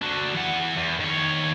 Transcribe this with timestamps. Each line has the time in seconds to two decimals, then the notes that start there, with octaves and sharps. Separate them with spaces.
0.02 D4 F#4
0.34 E3 F#5
0.76 E2
1.00 D#3 C#5